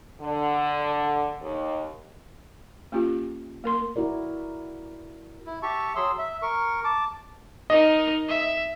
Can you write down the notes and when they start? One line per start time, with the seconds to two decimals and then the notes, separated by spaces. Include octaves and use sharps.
0.21 D3
1.42 D#2
2.92 A#3 C#4 F4 G4
3.64 A#3 A#4 C6
3.96 E4 F#4 A#4 D5
5.45 E4
5.62 G4 E5 A5 C#6
5.96 F#3 G#4 C6 E6
6.18 E5
6.42 A#4 C#6
6.84 A5 D6
7.70 D#4 A#4 D#5
8.28 E5